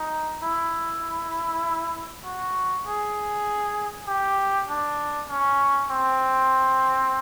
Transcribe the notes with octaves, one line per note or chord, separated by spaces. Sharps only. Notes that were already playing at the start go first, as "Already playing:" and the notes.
Already playing: D#4
E4
F#4
G#4
G4
D4
C#4
C4